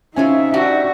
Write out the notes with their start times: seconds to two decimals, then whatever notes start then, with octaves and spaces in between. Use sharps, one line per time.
0.16 C3 A3 C#4 D#4 F4 E5 G#5
0.54 G3 D4 F#4 G4